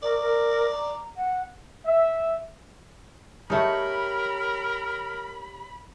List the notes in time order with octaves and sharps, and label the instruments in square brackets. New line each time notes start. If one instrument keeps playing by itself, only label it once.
[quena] A#4 [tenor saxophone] D5
[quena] A#4
A#5
F#5
[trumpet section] E5
[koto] A3 D#4 [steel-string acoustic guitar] G4 C#5 [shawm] A#4 [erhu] B5